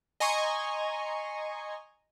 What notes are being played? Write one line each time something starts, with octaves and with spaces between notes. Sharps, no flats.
D#5 G#5 A#5 C6 C#6